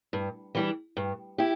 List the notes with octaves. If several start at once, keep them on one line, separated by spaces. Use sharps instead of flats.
G2
E3 G3 D4
G2
E4 G4